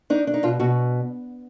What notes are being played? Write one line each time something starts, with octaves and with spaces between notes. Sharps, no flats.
D4 D#4
D4
D#4
B2 F4
B2 F#4